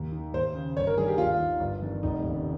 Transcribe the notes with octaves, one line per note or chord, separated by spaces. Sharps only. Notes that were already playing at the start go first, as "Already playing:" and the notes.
Already playing: D#2
D#3
D#2 C5
C#3
G1 C#5
A#4
G2 D#3 G#4
G4
D#2 F4
D#3
G1
F2 D#3
F1 D#4
D#2 C#3